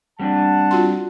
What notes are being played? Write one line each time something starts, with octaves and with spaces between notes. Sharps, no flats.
G3 C4 D4 F#5 A5
F4 F#4 C6